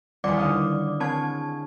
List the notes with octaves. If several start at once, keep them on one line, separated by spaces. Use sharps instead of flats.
D#1 E2 G3 D5 D6
D3 D#5 F5
G#3 C4 C#5 A5 G#6